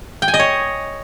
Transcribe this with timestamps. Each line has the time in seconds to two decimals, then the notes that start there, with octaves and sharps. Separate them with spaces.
0.22 G5
0.28 G#5
0.34 D#5
0.39 C#5